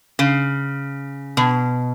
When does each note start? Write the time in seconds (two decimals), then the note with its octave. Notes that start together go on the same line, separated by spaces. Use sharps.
0.19 C#3
1.37 B2